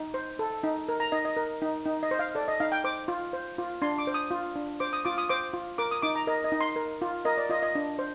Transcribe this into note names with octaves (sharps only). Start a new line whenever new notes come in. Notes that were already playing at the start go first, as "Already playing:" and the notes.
Already playing: D#4
C5
A4
D#4
A#4
A#5
D#4 D#5
D#5
A#4
D#4
D#4
D#5
C5
F5
A4 D5
D#5
D#4 F5
G5
C5 D6
F4
C5
F4
D4 C6
D6
C5
D#6
F4
D4
C5 D6
D#6
F4 D6
D#6
C5 D6
F4
A#4 D6
D#6
D#4 D6
A#5
A#4 D#5
D#5
D#4
C6
A#4
F4
A#4 D#5
D5
F4 D#5
D#5
D4
C5